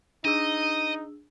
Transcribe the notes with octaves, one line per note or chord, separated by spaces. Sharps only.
D4 D#4 G#4 D#5 E6